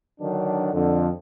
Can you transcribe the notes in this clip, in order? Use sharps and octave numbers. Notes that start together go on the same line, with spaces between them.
D3 D#3 F#3 D4
F2 D3